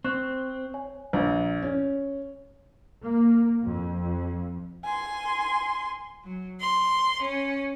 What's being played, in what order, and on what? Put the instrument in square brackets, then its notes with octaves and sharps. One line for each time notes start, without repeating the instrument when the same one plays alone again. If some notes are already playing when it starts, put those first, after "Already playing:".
[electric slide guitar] C4 [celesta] C#6 F#6 E7
[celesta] C#5 G#5
[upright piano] A#1
C#4
[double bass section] A#3
F2
[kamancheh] G#5 C6
[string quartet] F#3
C6
C#4